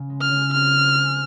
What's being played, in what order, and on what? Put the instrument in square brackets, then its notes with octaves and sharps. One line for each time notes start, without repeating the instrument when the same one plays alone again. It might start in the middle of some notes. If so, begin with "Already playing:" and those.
Already playing: [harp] C#3
G#3
[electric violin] F6
[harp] C#3
[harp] C4 [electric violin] F6
[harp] C4
G#3